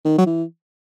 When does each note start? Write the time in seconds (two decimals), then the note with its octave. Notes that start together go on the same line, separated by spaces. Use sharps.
0.05 D#3
0.18 F#3
0.26 E3